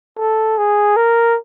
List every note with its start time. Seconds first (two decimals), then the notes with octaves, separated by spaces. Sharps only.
0.18 A4
0.58 G#4
0.96 A#4